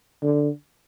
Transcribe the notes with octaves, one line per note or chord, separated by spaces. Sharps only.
D3